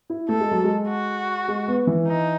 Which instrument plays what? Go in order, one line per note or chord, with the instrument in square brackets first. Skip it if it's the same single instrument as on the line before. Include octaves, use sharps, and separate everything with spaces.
[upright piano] E4
[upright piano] A3 [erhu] A4
[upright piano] G#3
F#3
G#3
[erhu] F#4
[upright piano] G#3
B3
E3
[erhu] D#4